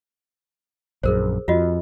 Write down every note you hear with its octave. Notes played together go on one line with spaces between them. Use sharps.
A#1 F#2 G#4 A#4 C5
F2 F4 F#4 D#5